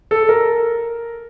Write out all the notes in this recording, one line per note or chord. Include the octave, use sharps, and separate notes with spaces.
A4
A#4